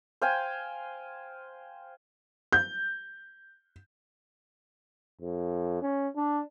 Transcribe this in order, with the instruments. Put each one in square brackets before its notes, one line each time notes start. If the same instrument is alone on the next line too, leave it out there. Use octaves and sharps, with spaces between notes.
[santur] C5 F5 G5 G#5
[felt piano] G6
[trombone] F2
C#4
D4